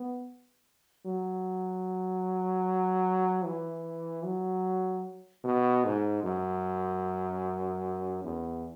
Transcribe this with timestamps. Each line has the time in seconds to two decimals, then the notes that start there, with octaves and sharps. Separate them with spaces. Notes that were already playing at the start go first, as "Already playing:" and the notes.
Already playing: B3
1.06 F#3
3.45 E3
4.24 F#3
5.44 B2
5.85 G#2
6.23 F#2
8.24 E2